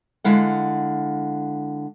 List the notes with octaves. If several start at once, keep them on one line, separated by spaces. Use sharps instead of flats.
D3 G#3 E4 F5 F#5